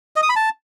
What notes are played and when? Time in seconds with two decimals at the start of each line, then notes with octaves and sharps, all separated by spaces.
0.16 D#5
0.23 D#6
0.29 B5
0.36 A5